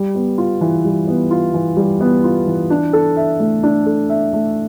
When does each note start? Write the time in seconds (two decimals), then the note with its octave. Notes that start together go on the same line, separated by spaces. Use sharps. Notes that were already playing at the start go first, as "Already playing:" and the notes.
Already playing: G3
0.15 B3
0.38 F4
0.61 E3
0.84 G3
1.08 B3
1.31 F4
1.54 E3
1.77 G3
2.01 B3
2.24 F4
2.47 E3
2.70 D4
2.93 A4
3.17 E5
3.40 A3
3.63 D4
3.86 A4
4.10 E5
4.33 A3